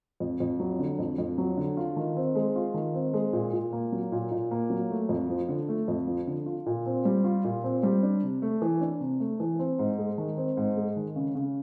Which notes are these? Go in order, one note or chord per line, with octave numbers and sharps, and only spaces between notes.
F2
F2
F#3
D3
F2
F2
F#3
D3
F4
D#3
C4
G#3
F4
D#3
C4
G#3
A#2
A#2
A#3
F#3
A#2
A#2
A#3
F#3
A3
F2
F3
D3
A3
F2
F3
D3
F4
A#2
C4
G3
F4
A#2
C4
G3
D4
C3
A3
E3
D4
C3
A3
E3
C4
G#2
G#3
D#3
C4
G#2
G#3
D#3
C#3
C#3